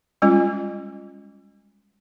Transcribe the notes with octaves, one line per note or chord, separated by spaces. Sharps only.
G3 G#3 C#4 F4